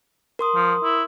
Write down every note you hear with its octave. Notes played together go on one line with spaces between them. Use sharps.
A#4 C6 D#6
F3
E4